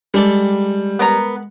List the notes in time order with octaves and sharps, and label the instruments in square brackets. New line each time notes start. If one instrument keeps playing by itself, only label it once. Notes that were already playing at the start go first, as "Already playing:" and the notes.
[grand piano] G3 [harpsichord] G#3 D4 A4
[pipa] B3 A#4 A#5